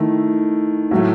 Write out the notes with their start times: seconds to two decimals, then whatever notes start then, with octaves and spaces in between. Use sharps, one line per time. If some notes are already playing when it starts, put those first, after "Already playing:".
Already playing: D#3 A3 E4
0.91 A2 F#3 A3 F#4